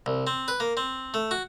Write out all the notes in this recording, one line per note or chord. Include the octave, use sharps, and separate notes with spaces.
C2
C4
B4
A#3
C4
A3
F#4